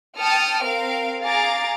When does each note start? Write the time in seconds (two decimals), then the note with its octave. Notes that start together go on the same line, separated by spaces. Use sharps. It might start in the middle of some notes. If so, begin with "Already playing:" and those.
0.19 G5 A5 D#6 F6 C#7
0.65 C4 A#4 F5 D7
1.22 G#4 F5 A#5 D6 A6